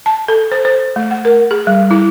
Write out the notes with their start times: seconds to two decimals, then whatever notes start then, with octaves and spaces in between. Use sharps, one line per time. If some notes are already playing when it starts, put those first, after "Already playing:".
0.06 A5
0.28 A4
0.52 C5
0.65 C5
0.96 A3
1.11 F#5
1.25 A#4
1.51 G#4
1.67 G3
1.91 E4